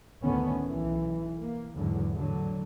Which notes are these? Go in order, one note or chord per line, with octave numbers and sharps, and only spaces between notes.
D2 A2 D3 D#3 B3 C#4
B1 E3
A#3
E2 G#2 D3 F#3
A2 D3 F#3